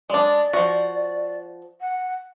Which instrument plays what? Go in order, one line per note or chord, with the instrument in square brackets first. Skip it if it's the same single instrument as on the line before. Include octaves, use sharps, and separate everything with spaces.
[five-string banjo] G#3 D4 [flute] D5
[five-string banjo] F3 F#4
[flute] F#5